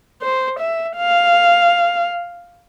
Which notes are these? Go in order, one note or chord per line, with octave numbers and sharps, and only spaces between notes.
C5
E5
F5